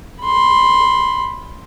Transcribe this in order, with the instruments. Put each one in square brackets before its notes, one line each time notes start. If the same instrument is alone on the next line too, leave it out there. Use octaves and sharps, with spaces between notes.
[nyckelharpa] B5 C6